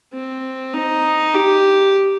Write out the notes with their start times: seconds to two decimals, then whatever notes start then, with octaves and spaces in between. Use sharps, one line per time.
0.13 C4
0.74 D#4
1.34 G4